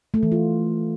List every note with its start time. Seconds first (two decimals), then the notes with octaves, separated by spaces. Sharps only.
0.14 A3
0.23 E3
0.32 F4